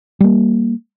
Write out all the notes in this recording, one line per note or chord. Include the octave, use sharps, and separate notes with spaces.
G3 A#3